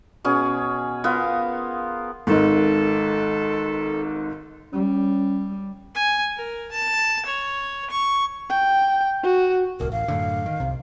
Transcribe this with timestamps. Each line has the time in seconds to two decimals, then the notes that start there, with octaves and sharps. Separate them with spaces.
0.24 B2 C#4 G#4
1.04 B3 F4 A#4 C5
2.27 G#1 G#2 A4
4.73 G3 C#4
5.95 G#5
6.36 A#4
6.72 A5
7.26 C#5
7.90 C#6
8.50 G5
9.23 F#4
9.80 D1 C2 A#4
9.92 A1 F5
10.08 F#2 A2 D3
10.46 D#3
10.60 C2 C3